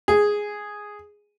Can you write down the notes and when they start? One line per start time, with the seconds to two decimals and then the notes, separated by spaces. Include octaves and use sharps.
0.08 G#4